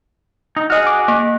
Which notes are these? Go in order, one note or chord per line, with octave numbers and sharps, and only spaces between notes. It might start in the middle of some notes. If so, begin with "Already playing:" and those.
D#4
F#4 G#4 D#5 F6
D6
A#3